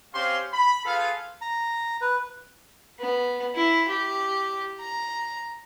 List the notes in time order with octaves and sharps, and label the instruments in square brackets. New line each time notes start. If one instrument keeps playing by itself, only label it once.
[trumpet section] C4 C#4 G4 F5 C6
B5
F4 G#4 A4 B4 F5
[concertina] A#5
B4
[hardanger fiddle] B3
E4
G4
A#5